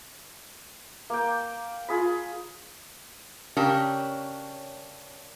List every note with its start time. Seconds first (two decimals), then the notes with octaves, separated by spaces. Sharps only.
1.10 A#3 G5
1.89 F4 G#4 B5
3.57 C#3 C#4 D4 G4 A#4